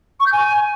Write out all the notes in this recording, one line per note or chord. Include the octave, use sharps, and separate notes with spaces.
C#6
G6
G#5